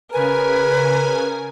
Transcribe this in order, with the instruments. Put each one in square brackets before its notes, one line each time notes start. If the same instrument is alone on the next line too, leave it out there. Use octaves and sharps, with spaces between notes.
[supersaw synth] C#3 G#5 [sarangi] A#4 [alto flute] B4